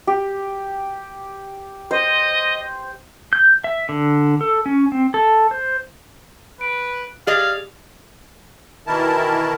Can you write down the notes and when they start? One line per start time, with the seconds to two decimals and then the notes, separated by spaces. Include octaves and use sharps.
0.07 G4
1.91 C5 D#5
3.33 G6
3.64 E5
3.89 D3
4.41 A4
4.66 C#4
4.92 C4
5.14 A4
5.51 C5
6.61 B4 D7
7.27 G4 G#4 D5 D#5 F5
8.87 B2 D#3 E3 E4 A#4 A5